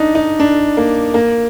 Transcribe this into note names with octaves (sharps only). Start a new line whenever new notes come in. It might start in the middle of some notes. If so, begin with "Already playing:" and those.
Already playing: D4 D#4
D#4
D4
A#3
A#3